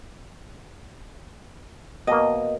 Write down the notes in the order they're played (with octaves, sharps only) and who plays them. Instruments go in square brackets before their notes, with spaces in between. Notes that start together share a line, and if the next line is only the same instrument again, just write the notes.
[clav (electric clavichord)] B2 A#3 [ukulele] D#5